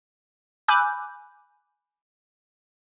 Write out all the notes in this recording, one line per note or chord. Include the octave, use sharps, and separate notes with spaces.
G#5 B5 D6 E6 F#6 G6